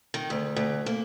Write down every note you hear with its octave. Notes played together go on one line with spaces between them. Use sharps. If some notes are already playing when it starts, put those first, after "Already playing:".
D#3
D2
D2
A#3